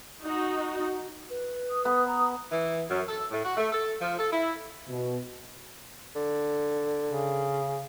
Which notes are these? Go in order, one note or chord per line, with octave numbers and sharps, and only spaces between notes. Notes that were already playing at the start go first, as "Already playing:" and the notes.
D#4 F#4
B4
D#6
B3
A#5
E3
F#2
A4
A2
F#4
A3
A4
F3
A4
E4
B2
D3
C#3